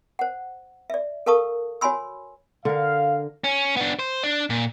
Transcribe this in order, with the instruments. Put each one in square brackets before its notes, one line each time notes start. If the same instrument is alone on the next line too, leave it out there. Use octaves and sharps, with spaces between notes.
[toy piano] C5 F#5
D5 E5
A4 A#4 F5 A5 C#6 D#6
F#4 C#5 G#5 B5 C6 E6
[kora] D3 A#4 [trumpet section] F5
[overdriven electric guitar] C#4
B3 D4
C5
D4
A#2